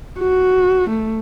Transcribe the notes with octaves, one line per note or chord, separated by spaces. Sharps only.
F#4
A3